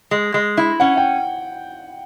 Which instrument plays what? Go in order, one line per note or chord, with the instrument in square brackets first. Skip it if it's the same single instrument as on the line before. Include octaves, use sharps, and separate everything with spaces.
[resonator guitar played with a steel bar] G#3
G#3
E4
[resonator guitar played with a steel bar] C#4 [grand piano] F#5
[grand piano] G5